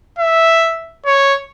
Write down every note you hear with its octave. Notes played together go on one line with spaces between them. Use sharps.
E5
C#5